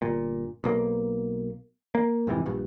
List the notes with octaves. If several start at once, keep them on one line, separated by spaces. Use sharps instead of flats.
G1 A#2
B1 B2 A#3
A#3
F2 G#2 C3 E3
A#1 G2